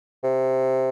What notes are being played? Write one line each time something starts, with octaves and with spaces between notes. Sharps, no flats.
C3